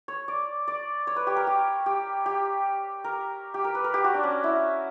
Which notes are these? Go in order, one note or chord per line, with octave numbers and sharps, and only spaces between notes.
C#5
D5
D5
C#5
B4
G4
A#4
G4
G4
G4
A#4
G4
A#4
B4
A#4
G4
F#4
D4
C#4
E4